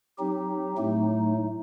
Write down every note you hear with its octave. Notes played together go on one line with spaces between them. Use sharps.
F#3 C4 D#4 G4
A2 F#3 A3 D#4